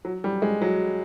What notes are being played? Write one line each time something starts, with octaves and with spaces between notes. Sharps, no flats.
F#3
G3
G#3
F#3